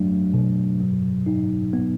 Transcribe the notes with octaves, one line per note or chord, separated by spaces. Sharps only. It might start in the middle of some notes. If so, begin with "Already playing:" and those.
Already playing: F#3 A3 D4
B2
F#3
D#4
B3